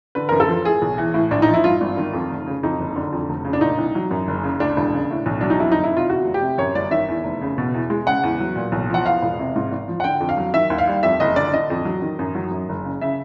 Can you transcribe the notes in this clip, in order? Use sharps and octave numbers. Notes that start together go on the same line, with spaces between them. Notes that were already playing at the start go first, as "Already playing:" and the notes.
D3 B4
F#2 A#4
A4
F3
A2 G#4
B1
E3
A2
A#1 D4
D#4
F3
E4
G2 F4
G#1
D#3
F2
F1
C#3
F2 D#4
F#1
D3
F2
F1
C#3
D4
A#2 D#4
C2
F#3
F#2
F#1
C#3
D2 D4
E1
C#3
A2
B1
F#3 D4
D#4
F2 E4
F#1 D#4
E4
C3 F4
E2 F#4
F1
G4
C3
F#2 C#5
G1 D5
D#3 E5
E2
F1
C#3
B2
E2
G#3
C#3 F#5
E2
F#3
A#2
B1
F3 F#5
E2 F5
E1
C3
G#2
G#1
F3
F#5
D3 G5
F2
F5
F#3
D#3 E5
D#2
F5
G3
F2 E5
F#1 D#5
D3 D5
D3 D#5
F2
F#3
D#3
F#2
F#3
F#2
F#1
C#3
C#3 E5